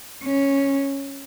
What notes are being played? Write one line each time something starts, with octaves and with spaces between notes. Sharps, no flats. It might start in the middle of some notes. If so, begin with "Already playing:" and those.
C#4